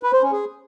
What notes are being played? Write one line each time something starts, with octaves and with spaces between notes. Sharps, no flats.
B4
C5
C#4
G#4